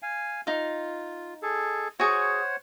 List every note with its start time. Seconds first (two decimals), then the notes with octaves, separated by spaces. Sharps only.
0.02 F5 G#5
0.47 D#4 F4 F5
1.42 G#4 A4
2.00 F#4 G#4 C5 C#5 F#5 G#5